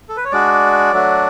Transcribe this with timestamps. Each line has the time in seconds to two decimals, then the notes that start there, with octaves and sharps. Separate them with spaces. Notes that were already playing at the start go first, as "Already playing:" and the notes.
0.09 A4
0.17 B4
0.25 C#5
0.32 G#3 D4 F#4 D5
0.92 F#3 A3 D4 F#4